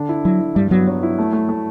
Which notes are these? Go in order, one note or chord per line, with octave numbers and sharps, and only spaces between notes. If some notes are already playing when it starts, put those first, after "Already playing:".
Already playing: D3 D4
E4
F#3 E4
E4
G2 G3
F#3 B3
F#3
E4
A3
A3
A3